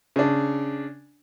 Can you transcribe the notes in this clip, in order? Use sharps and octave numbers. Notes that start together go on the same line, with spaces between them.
C#3 D4